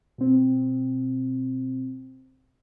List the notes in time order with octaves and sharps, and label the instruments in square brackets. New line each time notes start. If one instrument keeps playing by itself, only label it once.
[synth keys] B2 C4